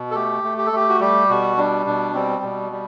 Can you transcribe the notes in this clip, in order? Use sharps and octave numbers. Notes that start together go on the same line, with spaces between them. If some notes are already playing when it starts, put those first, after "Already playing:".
Already playing: B2
A4
A3 G4
A3
G4
A4
A3 G4
F#4
G3 G4
B2 F#4
G3 D4
B2 D4
G3 C4
B2
G3